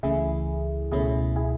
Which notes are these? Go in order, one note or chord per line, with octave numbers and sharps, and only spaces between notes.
C#2 C#3 E3 A3 E4 G#4
C#2 B2 A3 C#4 E4 G#4
E4 G#4